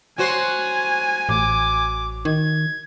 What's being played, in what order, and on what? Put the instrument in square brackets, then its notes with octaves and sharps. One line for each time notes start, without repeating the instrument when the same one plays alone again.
[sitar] F#3 F#4 C5 [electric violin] G#5
[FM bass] A1 [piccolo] D6
[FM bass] D#3 [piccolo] G#6